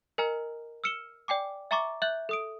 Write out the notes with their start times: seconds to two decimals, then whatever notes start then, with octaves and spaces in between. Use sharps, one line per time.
0.18 A#4 D#5 G#5 A#5 F6
0.84 E6 F6 C#7 E7 G7
1.28 D5 G5 G#5 D6
1.71 E5 G#5 A#5 C#6 D6 A6
2.02 E5 F#6 G6 F#7
2.29 A4 D#6 D7